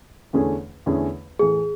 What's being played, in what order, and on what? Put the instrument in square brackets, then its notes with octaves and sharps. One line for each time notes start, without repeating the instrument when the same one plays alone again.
[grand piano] E2 D3 A3 C#4 G#4
E2 D3 A3 C#4 G#4
[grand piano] A2 E3 A3 [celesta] G#4